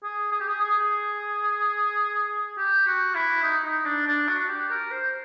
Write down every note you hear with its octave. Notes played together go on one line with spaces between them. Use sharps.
G#4
G#4
G4
G#4
G#4
G4
F#4
E4
D#4
D#4
D4
D4
F#4
G4
A#4
C5